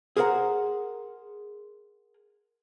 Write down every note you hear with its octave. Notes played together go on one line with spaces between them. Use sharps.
G#4 A#4 C5 D5 F#5 A#5